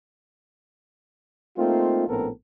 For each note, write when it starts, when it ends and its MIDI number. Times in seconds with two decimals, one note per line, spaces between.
1.57 2.05 57
1.57 2.05 58
1.57 2.05 60
1.57 2.05 63
1.57 2.05 65
2.08 2.29 34
2.08 2.29 45
2.08 2.29 59
2.08 2.29 60
2.08 2.29 69
2.08 2.29 70